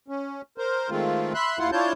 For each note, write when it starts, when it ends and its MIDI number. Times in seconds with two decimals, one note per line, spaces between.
0.08 0.42 61
0.58 0.90 70
0.58 0.90 72
0.90 1.33 51
0.90 1.33 56
0.90 1.33 57
0.90 1.33 60
0.90 1.33 65
1.34 1.59 76
1.34 1.59 83
1.34 1.59 84
1.34 1.59 90
1.59 1.70 39
1.59 1.70 64
1.59 1.70 65
1.59 1.70 78
1.59 1.70 84
1.72 1.93 62
1.72 1.93 64
1.72 1.93 65
1.72 1.93 73
1.72 1.93 81
1.72 1.93 91